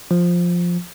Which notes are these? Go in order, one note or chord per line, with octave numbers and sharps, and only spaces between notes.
F3